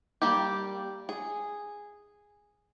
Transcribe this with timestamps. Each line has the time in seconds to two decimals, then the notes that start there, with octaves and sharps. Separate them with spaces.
0.22 G3 A#3 G4
1.09 G#4